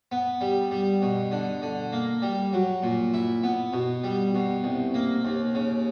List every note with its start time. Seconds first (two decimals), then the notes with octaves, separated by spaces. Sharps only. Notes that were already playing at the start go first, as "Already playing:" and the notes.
0.12 B3
0.41 G3
0.71 G3
1.02 B2
1.32 D3
1.62 D3
1.92 A#3
2.22 G3
2.53 F#3
2.83 A#2
3.14 E4
3.43 B3
3.73 B2
4.04 G3
4.34 B2
4.64 C2
4.94 A#3
5.25 D#2
5.55 C#3